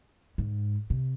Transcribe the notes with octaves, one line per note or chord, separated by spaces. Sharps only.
G#2
C3